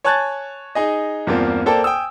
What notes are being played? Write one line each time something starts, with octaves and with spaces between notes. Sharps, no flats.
C#5 G#5 A5 F#6 G#6 A6
D#4 G#4 D#5
E2 G2 A#3 C4 F4
A#3 A4 C5 D5 G5 A5
G5 G#5 D#6 E6